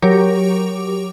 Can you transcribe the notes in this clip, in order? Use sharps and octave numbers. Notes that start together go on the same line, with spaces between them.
F#3 G4 A#4 C#5 D6